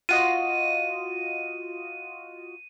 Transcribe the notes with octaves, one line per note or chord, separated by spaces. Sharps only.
F4 F#4 D#5 D#7